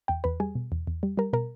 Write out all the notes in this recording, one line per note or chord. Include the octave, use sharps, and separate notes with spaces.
E2 G5
E2 B4
G3 G#4
B2
E2
E2
G3
G3 A#4
B2 A#4